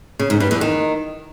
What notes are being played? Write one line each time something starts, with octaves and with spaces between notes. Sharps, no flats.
C#3
G#2
G2
E2
D#3